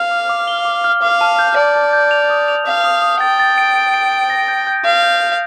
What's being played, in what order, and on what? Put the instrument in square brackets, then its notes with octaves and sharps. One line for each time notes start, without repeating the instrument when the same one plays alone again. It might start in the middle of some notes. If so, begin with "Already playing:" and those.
Already playing: [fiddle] F5 [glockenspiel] F6
[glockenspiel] D6
D6
G7
D6
F6
[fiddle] F5 [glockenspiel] D6
[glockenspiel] A5
G6
[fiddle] D5 [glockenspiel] A5
[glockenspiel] A5
G6
F7
D#6
F7
[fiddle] F5 [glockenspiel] D#6
[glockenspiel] D#6
D#6
[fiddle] G5 [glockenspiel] A6
[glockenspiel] A6
D7
D7
D7
D7
A#6
G6
G6
[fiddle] F5 [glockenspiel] G6
[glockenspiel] G6
G6